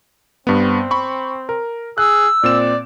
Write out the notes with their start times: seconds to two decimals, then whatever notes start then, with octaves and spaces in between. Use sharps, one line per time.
0.47 G2 B3 C4
0.91 B5 C#6
1.49 A#4
1.98 G#4 E6 F#6
2.43 A#2 C4 D5 E7